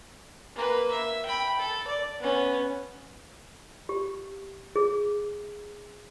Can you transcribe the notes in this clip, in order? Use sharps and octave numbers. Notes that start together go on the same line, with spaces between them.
A#3 B4
E5
G5 B5
A4
D5
B3 C#4
G4
G#4